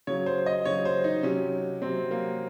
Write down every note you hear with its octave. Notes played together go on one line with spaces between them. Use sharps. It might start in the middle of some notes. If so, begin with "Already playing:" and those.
C#3 F#3 C#5
C5
D#5
C#3 F#3 C#5
C5
D#4
C3 F#3 C#4
C3 F#3 C4
A#3